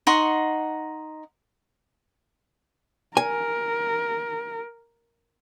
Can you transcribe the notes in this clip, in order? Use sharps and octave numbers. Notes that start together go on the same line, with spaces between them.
D#4 F#5 C6 C#6
A#4 G#5